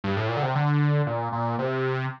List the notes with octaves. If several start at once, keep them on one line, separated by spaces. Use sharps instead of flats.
G2
A2
A#2
D3
C3
D3
A#2
A#2
C3